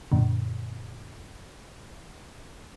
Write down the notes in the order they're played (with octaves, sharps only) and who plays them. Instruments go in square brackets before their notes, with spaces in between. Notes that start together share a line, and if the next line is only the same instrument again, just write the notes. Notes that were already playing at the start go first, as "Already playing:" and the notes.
[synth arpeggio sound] F#2 A#2 D3